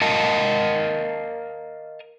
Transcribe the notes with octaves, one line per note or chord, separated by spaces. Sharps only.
A#4 D#5 F5 A5